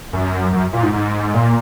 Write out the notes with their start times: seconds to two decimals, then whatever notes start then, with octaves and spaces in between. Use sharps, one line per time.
0.13 F#2
0.53 F#2
0.73 A#2
0.83 G#2
0.93 G#2
1.34 A#2